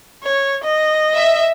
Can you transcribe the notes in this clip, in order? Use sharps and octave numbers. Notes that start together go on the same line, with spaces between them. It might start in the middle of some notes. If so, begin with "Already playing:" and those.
C#5
D#5
E5